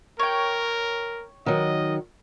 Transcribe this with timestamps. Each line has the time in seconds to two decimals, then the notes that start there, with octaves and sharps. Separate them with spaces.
0.19 A#4 C#5 G5
1.46 D#3 F#3 D#5